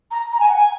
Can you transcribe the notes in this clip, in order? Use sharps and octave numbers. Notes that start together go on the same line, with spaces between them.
A#5
A#5
G#5
F#5
G#5